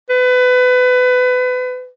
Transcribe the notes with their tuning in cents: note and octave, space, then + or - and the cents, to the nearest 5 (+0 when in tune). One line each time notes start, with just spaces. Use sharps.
B4 +25